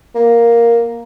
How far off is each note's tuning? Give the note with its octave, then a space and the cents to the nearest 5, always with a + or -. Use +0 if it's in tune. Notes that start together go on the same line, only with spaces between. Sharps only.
A#3 +5